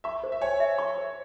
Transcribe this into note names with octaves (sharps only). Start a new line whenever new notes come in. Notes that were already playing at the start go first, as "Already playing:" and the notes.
E5 C#6
C5
E5
C#5 G#5
E5
C#6
C5